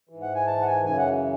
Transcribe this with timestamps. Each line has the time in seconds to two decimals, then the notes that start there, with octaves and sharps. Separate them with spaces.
0.09 G#2 E3
0.22 F#5
0.35 G#5
0.47 A5
0.61 F#5
0.67 G#5
0.85 F#2 C#3 E3 G#5
0.98 F#5